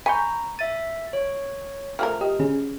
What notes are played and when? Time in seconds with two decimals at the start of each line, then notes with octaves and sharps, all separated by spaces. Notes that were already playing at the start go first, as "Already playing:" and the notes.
0.06 G#5 A#5 B5 C#6 G6
0.59 E5 A6 D#7
1.13 C#5
1.99 F3 A3 A#4 F6
2.21 G4 D#5
2.39 D3 C#4 G#4